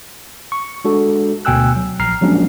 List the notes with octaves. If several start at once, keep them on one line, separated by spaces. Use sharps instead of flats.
C#6
G#3 D4 F#4 A4
D2 B2 G5 G#5 E6 F#6
F#3
A#1 A#5 F6 C7
F3 F#3 G#3 A#3 C#4 D4